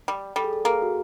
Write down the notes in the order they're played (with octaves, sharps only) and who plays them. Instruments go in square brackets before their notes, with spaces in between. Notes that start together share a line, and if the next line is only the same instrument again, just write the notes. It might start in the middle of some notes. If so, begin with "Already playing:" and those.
[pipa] G3
[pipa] G3 [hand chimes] A4
[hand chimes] G#4
A4
[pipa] A#3 [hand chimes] G#4
[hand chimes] F#4